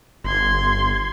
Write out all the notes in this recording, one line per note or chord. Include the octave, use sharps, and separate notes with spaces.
G1 C6 G#6